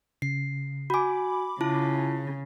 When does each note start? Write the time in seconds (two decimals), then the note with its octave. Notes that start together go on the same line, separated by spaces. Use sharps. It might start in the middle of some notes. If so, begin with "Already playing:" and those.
0.22 C#3 C7
0.90 F#4 G#5 B5 D6
1.61 C#3 E4 F4 A5